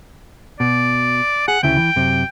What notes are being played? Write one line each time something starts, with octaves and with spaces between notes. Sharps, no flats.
B2 D5
G#4 F#5
D2 C#3 E4 G5
E3
F#2 C3